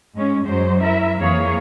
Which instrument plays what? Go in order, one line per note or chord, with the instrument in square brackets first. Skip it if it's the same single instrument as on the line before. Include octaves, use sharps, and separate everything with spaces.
[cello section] G#2 G#3 C#4
F#2 F#3 G#3 C5
E4 A#4 E5
F2 E3 A#3 G#4 C#5 F5